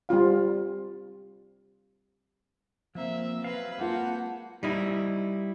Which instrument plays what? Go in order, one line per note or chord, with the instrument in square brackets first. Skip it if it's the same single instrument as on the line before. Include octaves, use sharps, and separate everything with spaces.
[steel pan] G3 C4 F4 F5
[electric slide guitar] F3 A#3 [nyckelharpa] C4 E5
[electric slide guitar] F#3 C4 F5 [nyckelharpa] B4
[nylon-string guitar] G#3 F4 [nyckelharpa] A#3 [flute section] F#5 A5 G6
[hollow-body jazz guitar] G3 D#4 E4